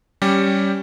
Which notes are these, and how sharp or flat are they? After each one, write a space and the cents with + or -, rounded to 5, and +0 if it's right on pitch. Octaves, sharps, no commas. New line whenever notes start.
G3 -10 C#4 +0 G4 +0